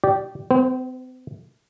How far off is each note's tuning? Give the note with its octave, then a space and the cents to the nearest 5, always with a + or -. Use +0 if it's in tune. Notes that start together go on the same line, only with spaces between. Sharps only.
G4 -15 D5 +0
C4 -45 C5 +5